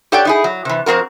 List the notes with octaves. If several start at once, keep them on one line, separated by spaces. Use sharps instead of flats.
G4 A4 C#5 D5 F#5 G5
D#4 E4 G#4
F#3
C3 E3
F2 C4 F#4 A#4